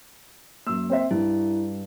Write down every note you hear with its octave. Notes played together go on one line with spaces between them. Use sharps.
F#2 A#3 E6
C4 C5 E5
G2 E4